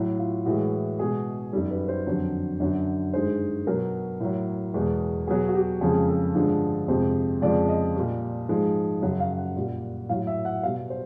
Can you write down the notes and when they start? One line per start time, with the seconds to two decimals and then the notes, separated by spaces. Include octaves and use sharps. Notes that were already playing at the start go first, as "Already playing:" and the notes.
Already playing: A2 F#3 E4
0.19 F4
0.46 A2 E3 G#3 F#4
0.99 B2 G#3 G#4
1.53 F#2 D#3 G3 A4
1.71 B4
1.88 C5
2.07 F2 D3 F#3
2.60 F#2 D3 F#3
3.13 G2 D#3 G#3 C5
3.67 B2 F#3 A#4
4.20 A2 F#3
4.74 E2 B2 G#3
5.27 B2 F#3 G#4
5.48 F#4
5.55 G4
5.81 F2 C#3 F3 G#3 G#4
6.08 A4
6.35 G2 D3 F3 G#3
6.88 F2 C3 F3 G#3 C5
7.42 F2 C#3 F3 G#3 D5
7.69 D#5
7.96 A#2 G3
8.49 G#2 F3 G#3
9.02 F#2 C#3 F#3
9.20 F5
9.38 F#5
9.56 A#2 G3
10.09 A2 F#3 F5
10.27 E5
10.45 F#5
10.63 B2 G3 F5
10.90 C5